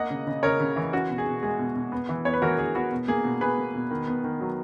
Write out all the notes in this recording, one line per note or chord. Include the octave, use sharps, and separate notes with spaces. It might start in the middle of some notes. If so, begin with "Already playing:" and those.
Already playing: A#3 D#5 F#5
C#3
C#3
C#3 A#4 C#5
C#3
E3
C#4 F#4
B2
G#4
B2
G#3 G#4
B2
B2
B3
E3
B3 C#5
B4
E3 F#4 A#4
E3 G#4
B3 F#4
B2
A#3 G#4
B2
B2 G#4 B4
A#3
B2
D#3
B3
D#3
F#3